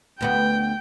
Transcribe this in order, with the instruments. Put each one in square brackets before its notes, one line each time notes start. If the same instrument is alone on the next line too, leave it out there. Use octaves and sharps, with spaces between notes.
[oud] D2 B3 F#4 [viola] G5